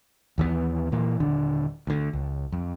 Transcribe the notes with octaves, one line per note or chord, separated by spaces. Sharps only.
D#2 E3 F3 B3
A#2 E3 A#3
D#1 D3 D4
D2 D3
C#2
F2